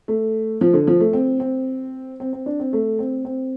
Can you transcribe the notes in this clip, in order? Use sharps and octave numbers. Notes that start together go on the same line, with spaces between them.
A3
F3
D3
F3
A3
C4
C4
C4
C4
D4
C4
A3
C4
C4